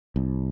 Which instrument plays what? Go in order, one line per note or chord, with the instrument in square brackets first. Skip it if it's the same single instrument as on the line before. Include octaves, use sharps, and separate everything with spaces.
[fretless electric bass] C2